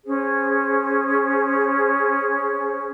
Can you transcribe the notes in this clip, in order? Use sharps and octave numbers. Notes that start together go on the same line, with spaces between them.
C#4 G#4 C5